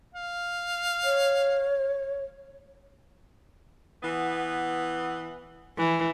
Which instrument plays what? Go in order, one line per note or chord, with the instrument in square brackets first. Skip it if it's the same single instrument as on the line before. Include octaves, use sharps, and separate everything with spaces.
[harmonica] F5
[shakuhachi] C#5
[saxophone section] E3 B3
[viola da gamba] E3